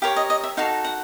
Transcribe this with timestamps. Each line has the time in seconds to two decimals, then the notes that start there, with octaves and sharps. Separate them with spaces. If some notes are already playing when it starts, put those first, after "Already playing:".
0.02 G4 A#4 C#5 F5
0.16 D#5
0.30 D#5
0.44 E5
0.57 D#4 F#4 A4 F5
0.85 F#5